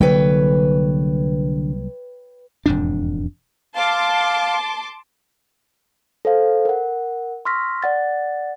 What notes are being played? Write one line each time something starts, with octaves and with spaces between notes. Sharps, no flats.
C2 D3 F#3 A#3 B4 C#5 G5
E1 F2 G#2 D4
F5 A5 C6 D6
A4 C5 F5
A#4 F#5
C6 C#6 E6 F6 A#6 B6
D5 F#5 A6